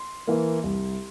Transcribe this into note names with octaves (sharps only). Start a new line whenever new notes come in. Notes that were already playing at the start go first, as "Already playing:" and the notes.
Already playing: C6
E3 A#3
C2